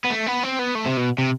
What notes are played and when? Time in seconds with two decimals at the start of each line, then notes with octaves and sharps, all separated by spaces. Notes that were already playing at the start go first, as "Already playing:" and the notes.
0.05 B3
0.11 A3
0.27 B3
0.44 C4
0.59 B3
0.75 A3
0.86 C3
0.97 B2
1.18 C3